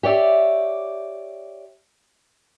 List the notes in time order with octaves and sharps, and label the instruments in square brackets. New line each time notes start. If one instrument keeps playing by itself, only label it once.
[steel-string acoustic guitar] G4 C#5 D5 E5